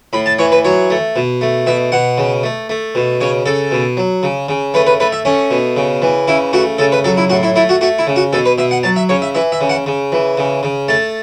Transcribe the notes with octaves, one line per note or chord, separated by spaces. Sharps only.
A2 B5
A5
E3 C#5
B4
F#3 C#5
A3
B2
A3
B2 E5
B2 F#5
C#3
A3
A3
B2
C#3 C#5
C#3 A4
B2
F#3
C#3
C#3
A3 B4
B4
A3 B4
E5
A3 C#4
B2
C#3
E3
C#3 E4
A3 F#4
C#3 A4
B4
F#3 A4
E4
A2 F#4
E4
A3 E4
F#4
A3 F#4
E4
C#3
F#4
B2 A4
B4
B2 E5
F#5
F#3 A5
E5
C#3 C#5
E5
E3 E5
E5
C#3
F#5
C#3
E3
C#3
C#3
A3 A5